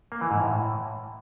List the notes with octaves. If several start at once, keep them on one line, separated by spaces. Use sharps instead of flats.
A#3
E3
G#2
A2